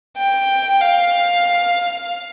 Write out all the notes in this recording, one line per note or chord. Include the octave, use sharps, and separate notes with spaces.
G5
F5